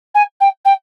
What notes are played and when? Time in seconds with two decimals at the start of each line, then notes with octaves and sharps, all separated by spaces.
0.14 G#5
0.40 G5
0.65 G5